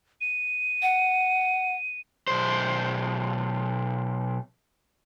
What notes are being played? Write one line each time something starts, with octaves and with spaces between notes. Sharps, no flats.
D#7
F#5
B1 C5